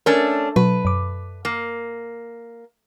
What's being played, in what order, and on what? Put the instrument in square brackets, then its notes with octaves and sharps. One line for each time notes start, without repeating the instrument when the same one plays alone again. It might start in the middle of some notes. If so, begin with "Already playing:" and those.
[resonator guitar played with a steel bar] A3 C#4 D4 [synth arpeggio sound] A#4
[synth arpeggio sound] B2 F#3 [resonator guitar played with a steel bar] B4
[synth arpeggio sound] F#2 D6
[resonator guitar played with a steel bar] A#3